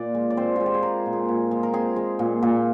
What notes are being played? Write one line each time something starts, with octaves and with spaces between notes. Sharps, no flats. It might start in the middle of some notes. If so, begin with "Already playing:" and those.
Already playing: A#2 D5
G#3
D5
C4 C5
G#3 F4
G4
G#4
G#3 A#4
A#2
G#4
A#2
G#3
A#4
C4 G#4
G#3
A#2
A#2